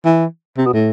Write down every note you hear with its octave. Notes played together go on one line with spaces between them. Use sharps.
E3
C3
B2
A2